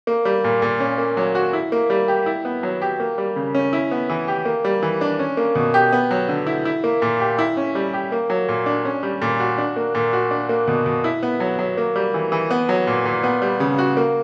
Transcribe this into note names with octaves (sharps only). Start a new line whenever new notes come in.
A#3
G3
A#2
A#2
C#4
A#3
F#3
F#4
E4
A#3
G3
G4
E4
B3
F#3
G4
A#3
G3
C#3
C#4
E4
B3
E3
G4
A#3
G3
E3
D4
C#4
A#3
B2
G4
B3
F#3
D3
E4
E4
A#3
A#2
G4
E4
C#4
G3
G4
A#3
F#3
A#2
D4
C#4
G3
A#2
F#4
D4
A#3
A#2
F#4
D4
A#3
B2
B2
E4
B3
F#3
F#3
A#3
G3
E3
E3
B3
F#3
A#2
A#2
B3
G3
C#3
F#4
A#3